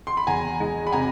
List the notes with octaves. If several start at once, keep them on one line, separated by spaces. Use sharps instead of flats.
C6
B5
E2 G#5 A#5
G#3
B5
C3 G#5 A#5